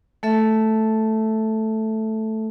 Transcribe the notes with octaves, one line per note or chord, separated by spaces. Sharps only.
A3 A4 E5